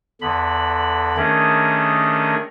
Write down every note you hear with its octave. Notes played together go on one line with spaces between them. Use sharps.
E2 D3 B5
D#3 A3 C#4 D4 G#4 A#4